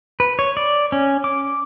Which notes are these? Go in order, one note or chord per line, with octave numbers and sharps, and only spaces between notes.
B4
C#5
D5
C#4
D6